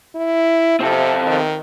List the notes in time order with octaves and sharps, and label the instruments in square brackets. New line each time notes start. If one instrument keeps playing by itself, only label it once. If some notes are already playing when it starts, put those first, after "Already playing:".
[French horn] E4
[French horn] C3 [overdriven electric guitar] C4 A4
[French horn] D#3